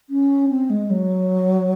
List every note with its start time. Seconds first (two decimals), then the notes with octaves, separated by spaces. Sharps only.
0.09 C#4
0.49 C4
0.70 G#3
0.90 F#3